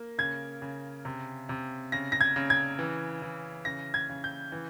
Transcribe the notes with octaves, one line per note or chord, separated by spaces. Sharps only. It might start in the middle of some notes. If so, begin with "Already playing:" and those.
Already playing: A#3
C#3 G#6
C#3
C3
C3
C#3 A#6
A#6
G#6
C#3
G#6
E3
E3
C#3 A#6
G#6
C#3
G6
E3